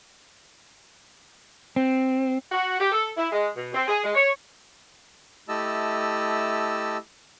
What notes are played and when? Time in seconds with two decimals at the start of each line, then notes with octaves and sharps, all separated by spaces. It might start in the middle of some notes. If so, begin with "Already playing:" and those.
1.76 C4
2.52 F#4
2.80 G4
2.92 A4
3.17 E4
3.32 G#3
3.56 B2
3.74 C4
3.88 G#4
4.04 G#3
4.15 C#5
5.49 A3 E4 G4 D#5 A5 E6